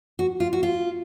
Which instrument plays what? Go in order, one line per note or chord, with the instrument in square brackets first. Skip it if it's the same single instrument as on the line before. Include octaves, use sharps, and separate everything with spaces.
[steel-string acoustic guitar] F#4
F4
F#4
F4